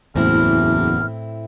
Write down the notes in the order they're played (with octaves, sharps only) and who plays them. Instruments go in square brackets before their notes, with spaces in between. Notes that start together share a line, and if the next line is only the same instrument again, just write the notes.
[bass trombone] F#1 [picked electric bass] E2 [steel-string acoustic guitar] A2 C4 E4 [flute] F6